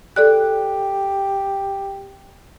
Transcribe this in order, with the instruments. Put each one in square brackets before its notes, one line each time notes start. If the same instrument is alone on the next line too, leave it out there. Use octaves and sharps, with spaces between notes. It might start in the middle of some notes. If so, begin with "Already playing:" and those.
[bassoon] G4 [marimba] A4 D5 F#6